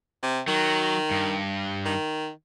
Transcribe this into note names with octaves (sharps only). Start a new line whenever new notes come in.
C3
D#3 F#3
G2
D#3